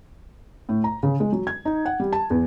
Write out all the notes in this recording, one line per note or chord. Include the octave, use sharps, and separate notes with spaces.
A2
A#5
C#3
G#3
F#3
G#6
D#4
F#5
G3
A5
E2